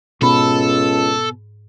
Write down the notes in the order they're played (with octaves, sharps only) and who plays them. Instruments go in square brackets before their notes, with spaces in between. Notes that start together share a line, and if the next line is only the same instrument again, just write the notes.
[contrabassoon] C#2 [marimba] G#2 B5 [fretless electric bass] B2 B3 [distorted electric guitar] A4